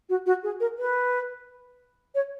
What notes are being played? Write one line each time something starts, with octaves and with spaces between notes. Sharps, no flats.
F#4
F#4
G#4
A#4
B4
C#5